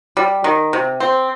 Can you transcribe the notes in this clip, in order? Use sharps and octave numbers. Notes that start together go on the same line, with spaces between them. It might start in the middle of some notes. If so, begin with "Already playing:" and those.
G3
D#3
C3
C4